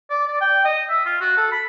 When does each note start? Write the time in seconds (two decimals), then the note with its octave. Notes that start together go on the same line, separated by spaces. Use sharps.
0.10 D5
0.28 D5
0.41 G5
0.65 D#5
0.89 E5
1.05 F4
1.21 F#4
1.37 A4
1.52 B5